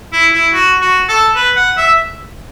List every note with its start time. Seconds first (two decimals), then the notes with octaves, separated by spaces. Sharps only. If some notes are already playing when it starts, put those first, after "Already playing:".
0.13 E4
0.34 E4
0.54 F#4
0.81 F#4
1.09 A4
1.36 B4
1.56 F#5
1.77 E5